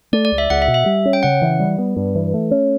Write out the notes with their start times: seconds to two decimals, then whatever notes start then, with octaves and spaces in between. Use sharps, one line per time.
0.13 A3 D5
0.25 D5
0.32 C#2
0.38 E5
0.50 C#2 F#5
0.62 E5
0.68 B2
0.74 E5
0.86 G3
1.05 C#4
1.13 G5
1.23 C#3 F#5
1.42 E3
1.60 G3
1.78 B3
1.97 G2
2.15 E3
2.34 A3
2.51 C#4